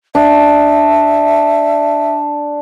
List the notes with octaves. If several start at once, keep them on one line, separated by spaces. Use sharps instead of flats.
D4 E5